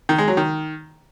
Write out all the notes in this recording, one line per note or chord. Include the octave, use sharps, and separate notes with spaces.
D#3
G#3
F#3
D#3